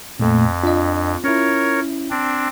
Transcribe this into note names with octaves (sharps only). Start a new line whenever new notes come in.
F2 A#2 A3
D4 F4 D#5
C#4 E4 A#4 C#5
C4 D4